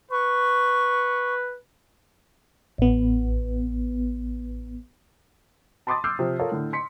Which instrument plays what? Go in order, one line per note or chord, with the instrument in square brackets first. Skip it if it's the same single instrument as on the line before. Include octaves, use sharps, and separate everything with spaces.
[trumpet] B4 [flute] C#6
[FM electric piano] A1 B3
[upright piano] A5 B5 C6 D6 D#6 A6
C6 D6 E6 F6 G6 C7
C3 F3
F4 A4 A#4 C#5
A2 D3
C6 B6 C#7